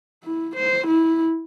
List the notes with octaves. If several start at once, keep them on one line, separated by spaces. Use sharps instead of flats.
E4
C5
E4